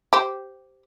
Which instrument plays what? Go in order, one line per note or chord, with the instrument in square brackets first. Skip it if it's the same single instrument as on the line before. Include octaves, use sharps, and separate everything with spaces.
[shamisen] G4 C5